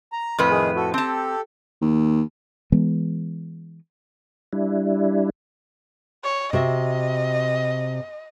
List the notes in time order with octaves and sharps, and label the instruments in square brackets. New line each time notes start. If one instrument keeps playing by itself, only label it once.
[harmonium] A#5
[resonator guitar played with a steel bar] F2 A2 B4
[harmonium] D#3 G#4
F#4 A4
[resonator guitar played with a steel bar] C4 A5 [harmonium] G4 A4
[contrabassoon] D#2
[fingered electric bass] E3 G#3 B3
[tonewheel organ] G3 D4 E4
[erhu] C#5
[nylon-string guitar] C3 F#4 E5 [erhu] D#5